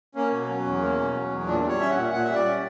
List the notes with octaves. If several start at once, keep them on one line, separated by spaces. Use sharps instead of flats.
A#3 C#4
B2
F#3
E2
A#3
B2
F#3
E2
A#2 D4
G3
C#5
C#4 E5
F#5
A#2
A#2 F#5
G3 E5
D5
C#4